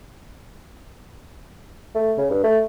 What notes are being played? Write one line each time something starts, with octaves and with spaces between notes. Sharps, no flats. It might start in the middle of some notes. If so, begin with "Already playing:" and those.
A3
C#3
G2
A3